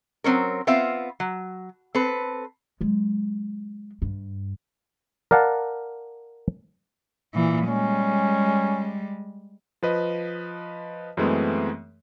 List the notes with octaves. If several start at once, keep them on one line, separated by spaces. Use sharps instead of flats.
F#3 C4 C#4 A#4
B3 C4 F4 E5 F5
F#3
C4 A4 B4
F#3 G#3
G2
A#4 D5 F5 F#5 A5
A#2 E3
G3 G#3 C#4
F3 B4 D#5
F#2 E3 G#3 A3 B3 C4